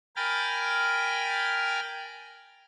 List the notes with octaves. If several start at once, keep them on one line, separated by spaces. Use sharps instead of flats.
A#4 G5 G#5 B5 F6 A6